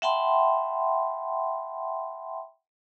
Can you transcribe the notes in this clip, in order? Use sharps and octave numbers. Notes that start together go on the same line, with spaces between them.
E5 F#5 G5 A5 B5 C6